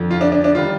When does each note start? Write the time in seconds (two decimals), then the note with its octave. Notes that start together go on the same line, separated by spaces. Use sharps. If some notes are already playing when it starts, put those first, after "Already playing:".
Already playing: F2 D3 F3
0.11 F4
0.21 D4
0.32 D4
0.44 D4
0.55 D#3 G3 F4